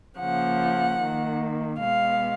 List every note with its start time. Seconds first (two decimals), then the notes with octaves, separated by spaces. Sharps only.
0.19 C#3 F3 A#3 F#5
1.00 D#3 A#3
1.80 B2 G#3 B3 F5